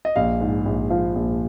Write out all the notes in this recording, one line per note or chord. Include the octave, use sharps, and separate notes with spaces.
D#5
A#1 F5
G#2
A#1
F3 F5
A#1